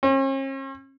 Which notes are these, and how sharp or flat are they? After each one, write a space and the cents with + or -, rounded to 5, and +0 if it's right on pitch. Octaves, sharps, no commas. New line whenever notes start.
C#4 -45